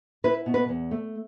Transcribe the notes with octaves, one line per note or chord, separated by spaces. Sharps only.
E4 B4
B2
B4
E2
A3